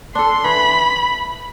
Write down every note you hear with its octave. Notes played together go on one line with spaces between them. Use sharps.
D4 A4 C6
E3 B5